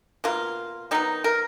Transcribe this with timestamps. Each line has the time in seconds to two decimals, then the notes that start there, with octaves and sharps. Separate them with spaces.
0.24 B2 A#3 F4
0.91 D#3 F#3 B3 D#4
1.24 A#4